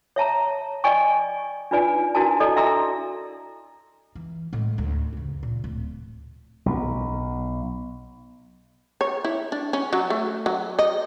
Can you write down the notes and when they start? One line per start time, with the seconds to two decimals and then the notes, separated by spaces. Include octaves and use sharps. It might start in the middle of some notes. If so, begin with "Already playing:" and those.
0.16 C#5 E5 A5 A#5
0.84 D5 D#5 G5 G#5 C#6
1.71 D4 D#4 F4 B4 D5 G#5
2.15 D4 E4 F#4 A#4 G#5 A5
2.40 E4 A4 D5 D#5
2.56 D4 D#5 E5 A#5 C6 E6
4.15 E3
4.53 A2 G#3
4.78 D2
5.13 F#2 C#3
5.43 A#2
5.64 D1
6.66 B1
9.01 C#5
9.24 E4
9.52 D4
9.73 C#4
9.93 F#3
10.10 A3
10.46 F#3
10.79 D#5